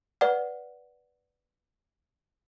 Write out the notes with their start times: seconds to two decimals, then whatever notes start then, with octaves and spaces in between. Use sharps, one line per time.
0.21 B4 D5 F#5